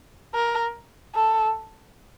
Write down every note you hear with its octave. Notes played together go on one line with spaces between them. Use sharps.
A#4
A4